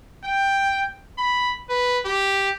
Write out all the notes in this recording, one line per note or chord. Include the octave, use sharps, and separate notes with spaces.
G5
B5
B4
G4